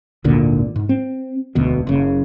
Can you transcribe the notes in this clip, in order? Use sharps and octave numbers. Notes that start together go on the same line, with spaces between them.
G#1 D2 A#2 D3
G#2
C4
E1 D2 B2
F#1 C#3